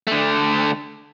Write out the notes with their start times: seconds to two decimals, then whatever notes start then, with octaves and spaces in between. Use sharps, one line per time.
0.07 D3 A3